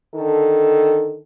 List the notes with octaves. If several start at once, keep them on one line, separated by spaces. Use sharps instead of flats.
D3 D#3 A4